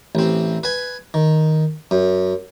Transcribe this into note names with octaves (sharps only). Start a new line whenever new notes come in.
A1 C4
B4 G#5
D#3
F#2